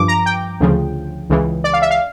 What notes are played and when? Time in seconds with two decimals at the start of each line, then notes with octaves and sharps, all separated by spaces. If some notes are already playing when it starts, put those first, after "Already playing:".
Already playing: G2 F3 D6
0.08 A#5
0.26 G5
0.60 D2 C#3 F3
1.30 C#2 C#3 E3
1.64 D5
1.73 F5
1.82 E5
1.91 F5